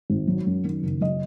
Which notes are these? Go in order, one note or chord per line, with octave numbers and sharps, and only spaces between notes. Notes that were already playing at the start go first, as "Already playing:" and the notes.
G#1
F#3
F#2
D#3
F#1
F#3 D#5